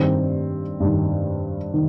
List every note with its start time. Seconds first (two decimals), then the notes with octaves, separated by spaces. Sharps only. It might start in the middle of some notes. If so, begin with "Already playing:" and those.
Already playing: G2 D#3 C4
0.80 G2 D#3
1.74 D#3